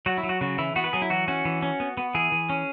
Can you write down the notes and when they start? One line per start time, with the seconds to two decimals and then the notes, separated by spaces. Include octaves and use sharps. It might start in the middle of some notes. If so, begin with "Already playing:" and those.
0.06 F#3 F#4
0.18 E4
0.23 F#3
0.29 F#4
0.41 C#3 F#4
0.58 E3 E4
0.76 B3 F#4
0.84 B4
0.93 F#3 G#4
1.02 E4
1.10 E3 F#4
1.28 C#4 F#4
1.45 E3
1.63 C#4
1.80 B3
1.97 B3
2.15 E3 G#4
2.32 E3
2.50 C#4